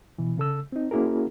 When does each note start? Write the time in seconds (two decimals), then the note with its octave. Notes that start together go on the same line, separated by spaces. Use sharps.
0.18 B2 E3
0.38 C#3 A4 E6
0.72 C4 D#4
0.91 A#3 C#4 E4 F#4 G#4 A#4